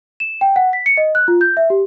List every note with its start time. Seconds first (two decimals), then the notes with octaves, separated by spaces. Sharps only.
0.20 E7
0.41 G5
0.56 F#5
0.73 B6
0.86 C#7
0.97 D#5
1.15 F#6
1.28 F4
1.41 G6
1.57 E5
1.70 G4